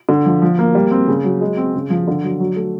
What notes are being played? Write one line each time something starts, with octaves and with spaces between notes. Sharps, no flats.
D3
F3
F3
A#3
G3
C4
C#3
F#3
G#3
C4
C#3
F3
D3
F#3
F#3
A3